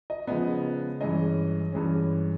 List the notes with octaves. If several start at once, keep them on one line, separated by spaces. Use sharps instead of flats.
D#5
C#3 F3 G#3 B3 D#5
G2 E3 G#3 C#4 D#5
G2 E3 G#3 C#4